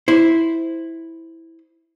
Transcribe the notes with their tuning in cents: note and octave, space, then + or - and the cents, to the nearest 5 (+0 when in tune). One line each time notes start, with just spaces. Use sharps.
E4 -5 C5 -10